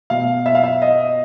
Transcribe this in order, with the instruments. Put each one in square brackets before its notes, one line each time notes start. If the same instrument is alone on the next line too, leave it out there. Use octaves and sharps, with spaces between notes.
[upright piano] B2 F5
E5
F5
E5
D#5